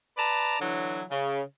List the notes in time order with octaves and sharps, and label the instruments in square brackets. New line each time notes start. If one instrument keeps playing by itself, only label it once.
[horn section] B4 D5 A5 A#5
D3 E3 F#3
C#3